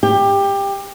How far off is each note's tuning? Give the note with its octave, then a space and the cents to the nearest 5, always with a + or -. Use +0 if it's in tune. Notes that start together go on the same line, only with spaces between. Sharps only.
G4 +20